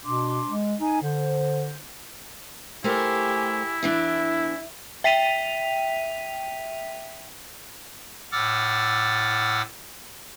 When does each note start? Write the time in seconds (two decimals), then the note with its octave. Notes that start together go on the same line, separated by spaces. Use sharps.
0.04 B2 D4 C6 D6
0.49 G#3
0.81 D#4 G#5
1.02 D3 C5
2.84 A3 E4 G4 A#4 C5 G#5
3.83 E2 E3 D4 E5
5.04 E5 G5 B6 D#7 F7
8.32 A2 F#5 D6 E6 F6 A6